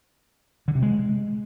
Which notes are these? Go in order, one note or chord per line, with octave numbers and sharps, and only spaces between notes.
D3
C3
G#3